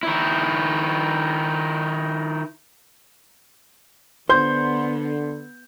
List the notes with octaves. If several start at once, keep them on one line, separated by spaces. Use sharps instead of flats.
D#3 E4
D3 B3 C5 C6 G6